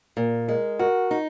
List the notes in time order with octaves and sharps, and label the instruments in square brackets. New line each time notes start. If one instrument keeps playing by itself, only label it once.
[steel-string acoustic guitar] A#2 [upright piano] A#4
[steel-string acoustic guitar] G#3 [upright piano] A#4
[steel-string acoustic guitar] F#4 [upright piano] A#4
[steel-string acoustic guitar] D#4